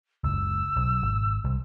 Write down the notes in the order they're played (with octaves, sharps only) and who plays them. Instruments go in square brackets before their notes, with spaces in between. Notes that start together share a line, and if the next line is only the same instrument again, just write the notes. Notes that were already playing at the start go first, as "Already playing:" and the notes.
[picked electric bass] F#1 C#2 [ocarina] E6
[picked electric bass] B1
G#1
C2